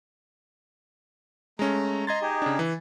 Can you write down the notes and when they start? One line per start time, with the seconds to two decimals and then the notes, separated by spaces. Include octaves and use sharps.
1.59 G#3 A3 C#4 A#5
2.07 D#5 A#5 C6 G#6 A6
2.22 D#4 G4 G#4
2.42 C#3 D4
2.59 E3